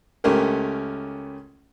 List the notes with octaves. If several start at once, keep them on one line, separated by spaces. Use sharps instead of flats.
C#2 A3 C#4 G4 A#4